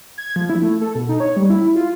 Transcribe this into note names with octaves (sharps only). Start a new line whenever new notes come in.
G#6
F3
E4
A3
A4
B2
D#4
C#5
G3
E4
F4